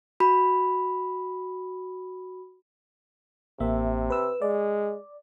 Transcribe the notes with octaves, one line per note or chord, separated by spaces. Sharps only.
F#4 B5
A1 C3 A#3 E5
B4 E6
G#3 D5